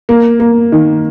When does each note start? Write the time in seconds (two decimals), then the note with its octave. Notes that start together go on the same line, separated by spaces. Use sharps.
0.09 A#3
0.40 A#3
0.72 D#3